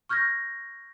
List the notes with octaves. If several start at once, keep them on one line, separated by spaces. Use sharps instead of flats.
C#6 F6 G6 G#6 A#6